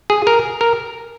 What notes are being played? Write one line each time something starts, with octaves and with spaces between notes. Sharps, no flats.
G#4
A#4
A#4